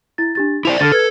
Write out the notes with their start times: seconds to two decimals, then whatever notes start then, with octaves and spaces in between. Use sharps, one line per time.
0.18 E4 A6
0.35 D4 G4 A6
0.65 E4 C5 D5 F7
0.80 D3 A4 F6 A6
0.92 A4 B4 G#6